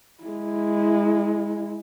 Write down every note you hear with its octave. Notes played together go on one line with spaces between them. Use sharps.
G#3 E4